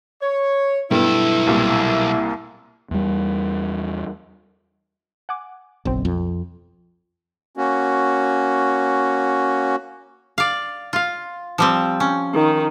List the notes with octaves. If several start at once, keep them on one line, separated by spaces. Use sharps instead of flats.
C#5
B1 G2 A3 B3 E4 A4
C2 A#2 G3
E2 G3
F#5 G#5 D6
F#1 B1 C4
F2
A#3 C#4 F#4
D5 F5
F4 F5
F3 G3 C4
C#4
D#3 D#4